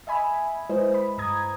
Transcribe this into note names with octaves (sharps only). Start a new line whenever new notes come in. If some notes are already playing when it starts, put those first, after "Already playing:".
D#5 E5 G#5 B5
G#3 E4 B4 C5 D#5
B5
G2 A#5 D#6 G#6